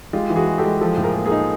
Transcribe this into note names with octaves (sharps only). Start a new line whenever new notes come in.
G#3 F4 G4
E3
F#4 G#4
G#3
G4 A4
G#3
F3 G4 A4
A2
G#4 A#4
A#3
G#4 A#4
D#4